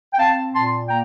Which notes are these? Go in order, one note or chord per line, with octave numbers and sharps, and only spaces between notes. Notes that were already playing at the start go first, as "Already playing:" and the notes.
G5
C4 F5 A5
A#2 A5 C6
A#3 G5 A#5